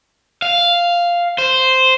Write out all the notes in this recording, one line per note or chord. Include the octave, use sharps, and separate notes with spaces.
F5
C5